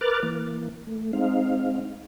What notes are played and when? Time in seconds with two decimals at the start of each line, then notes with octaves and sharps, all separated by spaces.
0.01 A#4 B4 D6 F6 F#6 A6
0.23 E3 A#3
0.87 A3
1.13 G#3 C4 D#4 F5